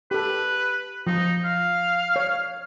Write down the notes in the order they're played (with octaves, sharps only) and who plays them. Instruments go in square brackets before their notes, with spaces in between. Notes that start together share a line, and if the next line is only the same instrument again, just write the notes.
[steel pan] G4 A4 [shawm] B4
[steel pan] F3 [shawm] D#4
[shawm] F5
[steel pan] C#5